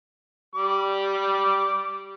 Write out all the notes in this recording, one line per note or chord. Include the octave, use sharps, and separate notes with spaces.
G3 D6